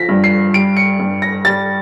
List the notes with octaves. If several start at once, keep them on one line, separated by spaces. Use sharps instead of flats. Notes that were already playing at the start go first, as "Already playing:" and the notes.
Already playing: F3 A#6 B6
G2
C7
G3 D7
C#7
G2
A#6
G3 A6